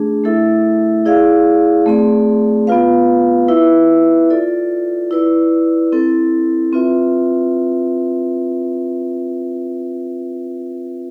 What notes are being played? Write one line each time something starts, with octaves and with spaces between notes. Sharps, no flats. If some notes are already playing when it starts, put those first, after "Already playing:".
Already playing: A3 D4 G#4
A3 E4 A4 E5
E4 G#4 D5 F5
A3 C4 G#4 D5
B3 F4 B4 F5
E4 B4 E5
F4 A4 D5
E4 B4 D5
C4 E4 A4
C4 F4 B4 E5